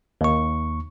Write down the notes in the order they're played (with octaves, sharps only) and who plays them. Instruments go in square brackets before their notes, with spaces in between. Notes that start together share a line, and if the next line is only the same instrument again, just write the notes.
[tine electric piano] D#2 C#6